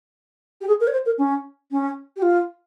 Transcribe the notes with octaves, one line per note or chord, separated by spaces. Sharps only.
G4
G#4
A#4
C#5
C5
A#4
C#4
C#4
G4
F4